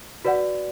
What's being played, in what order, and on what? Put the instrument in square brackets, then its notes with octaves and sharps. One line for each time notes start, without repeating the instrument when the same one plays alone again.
[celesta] F#4 B4 D5 F#5